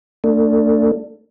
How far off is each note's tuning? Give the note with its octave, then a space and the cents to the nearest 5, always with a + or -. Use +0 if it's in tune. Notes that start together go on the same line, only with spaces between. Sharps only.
A3 +35 D4 +0